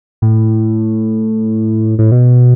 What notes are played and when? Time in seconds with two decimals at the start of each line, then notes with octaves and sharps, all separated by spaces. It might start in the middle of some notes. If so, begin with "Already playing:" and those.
0.22 A2
1.99 A2
2.12 B2